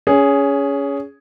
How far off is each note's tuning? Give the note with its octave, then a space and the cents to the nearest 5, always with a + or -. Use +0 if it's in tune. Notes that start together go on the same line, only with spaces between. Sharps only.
C#4 +20 G#4 +0